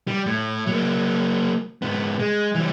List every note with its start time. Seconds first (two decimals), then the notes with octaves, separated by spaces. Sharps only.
0.07 G3
0.26 A2
0.66 F#3 A#3
1.82 G#2 B3
2.19 G#3
2.55 E3 G3